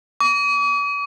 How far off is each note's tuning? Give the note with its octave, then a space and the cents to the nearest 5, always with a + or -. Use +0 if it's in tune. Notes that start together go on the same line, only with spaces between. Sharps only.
D6 -45